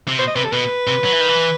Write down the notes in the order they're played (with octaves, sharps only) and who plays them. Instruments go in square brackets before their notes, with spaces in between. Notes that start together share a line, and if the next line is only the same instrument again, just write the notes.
[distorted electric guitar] C3
[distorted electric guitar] B2 [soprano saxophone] C5
[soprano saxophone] D#5
[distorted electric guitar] C3 [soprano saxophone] B4
[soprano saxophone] A4
[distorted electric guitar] B2 [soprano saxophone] B4
[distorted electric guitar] C3
F#3
E3
D#3
E3